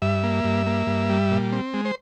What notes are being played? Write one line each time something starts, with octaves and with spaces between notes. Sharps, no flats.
G2 E5
A#3
G2
A#3
G2
G3
A#2
C4
G#3
C5